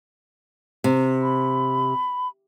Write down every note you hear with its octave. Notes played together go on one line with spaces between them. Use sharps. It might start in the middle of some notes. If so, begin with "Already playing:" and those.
C3
B5